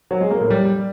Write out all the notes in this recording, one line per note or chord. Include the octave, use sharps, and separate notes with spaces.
F#3
G#3
A#3
A2
G3